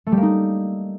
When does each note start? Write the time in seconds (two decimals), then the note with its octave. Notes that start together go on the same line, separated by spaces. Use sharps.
0.07 A3
0.12 G3
0.17 A#3
0.23 D#4